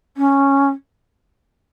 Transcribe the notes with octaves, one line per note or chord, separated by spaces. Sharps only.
C#4